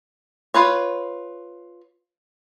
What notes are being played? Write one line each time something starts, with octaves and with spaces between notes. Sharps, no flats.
F4 B4 C#5